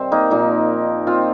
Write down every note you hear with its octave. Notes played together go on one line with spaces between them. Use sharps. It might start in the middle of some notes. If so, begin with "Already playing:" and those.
Already playing: C3 D#3 G3 C4
A#3 D#4
A#2 F3 A#3 D#4
C4 F4